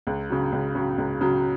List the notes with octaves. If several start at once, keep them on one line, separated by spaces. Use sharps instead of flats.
C#2
C#3 F#3
C#2
C#3 F#3
C#2
C#3 F#3